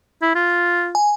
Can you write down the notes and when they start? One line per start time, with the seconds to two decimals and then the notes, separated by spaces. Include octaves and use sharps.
0.22 E4
0.35 F4
0.95 G#5